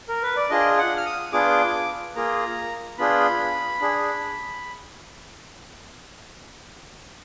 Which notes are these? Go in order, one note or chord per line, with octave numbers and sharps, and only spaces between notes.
A#4
B4
D5
D4 F4 G#4 D#5
F#5
F6
D#6
B3 D4 F4 G#4 D6
A#3 F4 G#4 A#5
B3 D4 F4 G#4 B5
D4 G#4